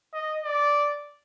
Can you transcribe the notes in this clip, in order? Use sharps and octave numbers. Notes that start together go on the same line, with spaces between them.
D#5
D5